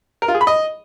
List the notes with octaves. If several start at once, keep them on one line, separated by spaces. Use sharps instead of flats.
A#4
F4
G#4
B5
D#5